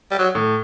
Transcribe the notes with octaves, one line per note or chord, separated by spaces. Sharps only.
G3
F#3
A2